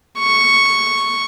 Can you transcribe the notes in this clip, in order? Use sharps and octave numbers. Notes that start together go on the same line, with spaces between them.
C#6